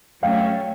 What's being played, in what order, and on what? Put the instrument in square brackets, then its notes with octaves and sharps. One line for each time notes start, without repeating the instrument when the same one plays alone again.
[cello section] F#3 A3 C#4 [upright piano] F5 G5